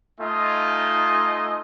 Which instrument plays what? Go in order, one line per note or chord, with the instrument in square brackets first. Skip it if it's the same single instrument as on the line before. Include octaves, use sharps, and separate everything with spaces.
[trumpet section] A3 D#4 F4 D#5 G#5